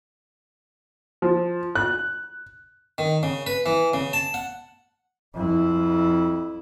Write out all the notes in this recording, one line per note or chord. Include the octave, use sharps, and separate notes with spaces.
F3
F#6
D#3
C#3
B4
E3
C#3
A5
F#5
F2 E4